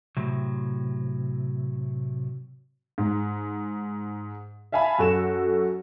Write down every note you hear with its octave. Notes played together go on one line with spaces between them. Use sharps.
A2 C3 F#3
G#2
E5 F5 G#5 A5 B5
F#2 F#4 A4 E7